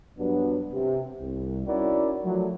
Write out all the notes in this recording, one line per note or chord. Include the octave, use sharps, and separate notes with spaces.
G2 F#3 B3 D4
C3
C2
C#4 D#4 E4 F#4 A#4 D5
F3 F#3 A3